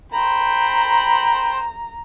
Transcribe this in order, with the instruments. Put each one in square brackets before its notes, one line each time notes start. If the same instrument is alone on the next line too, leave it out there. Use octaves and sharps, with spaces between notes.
[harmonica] C5 G5 B5 [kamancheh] A#5